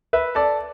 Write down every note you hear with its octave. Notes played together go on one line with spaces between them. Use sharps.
B4 E5
A4 D5